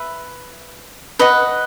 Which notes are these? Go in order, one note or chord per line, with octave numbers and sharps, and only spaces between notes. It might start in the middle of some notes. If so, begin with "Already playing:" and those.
Already playing: B4 E5
B4 D#5 F#5